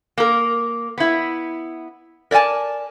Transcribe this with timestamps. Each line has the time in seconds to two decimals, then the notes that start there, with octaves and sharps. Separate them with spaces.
0.18 A#3 A#4
0.98 B3 E4
2.31 A#4 D5 E5 G#5 A5